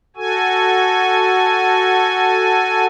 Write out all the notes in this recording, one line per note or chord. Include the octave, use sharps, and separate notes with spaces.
F#4 A4 G#5